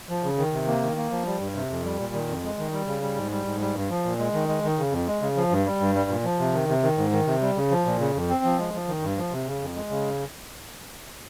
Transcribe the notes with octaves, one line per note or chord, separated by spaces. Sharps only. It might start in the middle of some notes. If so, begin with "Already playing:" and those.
F3
C#3
D#3
C3
A#3
D#3
A#3
F3
G3
G2
C3
F2
G3
A#2
D#3
F2
G#3
D#3
G3
C#3
G3
G#2
G3
G#2
G3
G2
F3
A#2
G#3
D#3
G#3
D#3
C#3
F2
G#3
C#3
F3
G2
G3
G2
G3
A#2
F3
C3
D#3
C3
D#3
G#2
D#3
C3
G3
C#3
F3
A#2
C#3
F2
C4
F3
G#3
F3
D#3
G2
F3
C3
C#3
F2
G#3
C#3